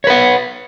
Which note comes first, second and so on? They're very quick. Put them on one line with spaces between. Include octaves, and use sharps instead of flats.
C#5 B4 F#5